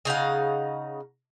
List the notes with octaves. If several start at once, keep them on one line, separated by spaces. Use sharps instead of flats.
C#3 D#4 F5 F#5